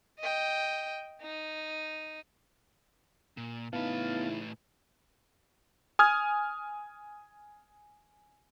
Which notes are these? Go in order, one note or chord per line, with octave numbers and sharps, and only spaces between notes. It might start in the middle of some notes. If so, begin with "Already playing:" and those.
D#5 G5
D#4
A#2
A2 C#3 B3 D#4 E4 B4 F5 A5
G#5 D#6 F6 G#6